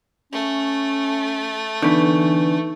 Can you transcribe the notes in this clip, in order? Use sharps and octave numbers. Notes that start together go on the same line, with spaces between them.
A3 C#4
D3 E3 B3 D#4 C#6 G6